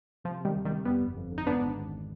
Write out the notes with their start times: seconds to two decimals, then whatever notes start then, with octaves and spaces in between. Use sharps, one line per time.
0.24 C3 F3
0.40 C3 D#3 G3
0.56 D2
0.65 D#3 G3
0.71 C3
0.85 F2 G3 B3
1.01 G1
1.17 F2
1.32 D3
1.38 D#4
1.47 G#2 B3 D4
1.62 G#1
1.77 G#1